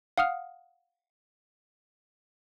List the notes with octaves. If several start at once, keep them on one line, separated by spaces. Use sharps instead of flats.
F5 F#5 D#6 F6